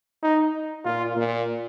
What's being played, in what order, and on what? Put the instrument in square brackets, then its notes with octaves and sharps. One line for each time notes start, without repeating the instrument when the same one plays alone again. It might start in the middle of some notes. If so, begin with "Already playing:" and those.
[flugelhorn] D#4
[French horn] A#2 [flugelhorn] F4
[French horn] A#2